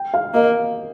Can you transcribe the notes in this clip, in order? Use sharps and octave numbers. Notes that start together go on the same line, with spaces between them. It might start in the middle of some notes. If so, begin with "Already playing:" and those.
Already playing: G5
F5
A#3 D#5